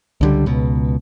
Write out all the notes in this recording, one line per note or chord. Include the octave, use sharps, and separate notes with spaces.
C#2 D3 G3
C#2 B2